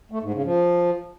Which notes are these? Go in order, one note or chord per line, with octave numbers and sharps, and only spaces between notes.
A3
G#2
C#3
F3